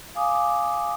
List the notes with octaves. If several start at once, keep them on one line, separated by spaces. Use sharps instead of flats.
F5 G#5 D6 D#6